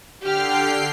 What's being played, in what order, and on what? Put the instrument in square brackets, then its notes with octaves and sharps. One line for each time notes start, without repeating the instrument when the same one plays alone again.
[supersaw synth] D3 G5 C7 [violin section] G4 F6